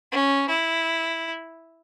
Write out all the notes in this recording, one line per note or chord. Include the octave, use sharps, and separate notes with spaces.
C#4
E4